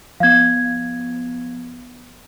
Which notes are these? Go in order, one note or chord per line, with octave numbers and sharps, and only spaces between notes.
F3 B3 F5 G#6